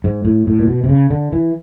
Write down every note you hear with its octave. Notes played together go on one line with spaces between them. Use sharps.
G#2
A2
A2
A#2
B2
C3
C#3
D3
E3